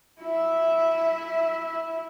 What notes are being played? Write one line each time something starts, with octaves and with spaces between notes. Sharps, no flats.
E4 E5